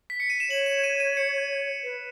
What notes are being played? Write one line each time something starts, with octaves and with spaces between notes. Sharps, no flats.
B6
C#7
D#7
E7
C#5 F#7
E7
D#7
D#7
C#7
B4